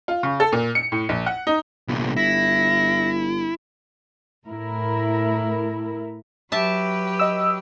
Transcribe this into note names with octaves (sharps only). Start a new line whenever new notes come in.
F4
C#3
A4
A#2
C#7
A2
A#1
F#5
D#4
G1 C2 A#2
E4 A#6
A2 E4 A#4
F#3 G4 B4 E5 A5
D#5 E6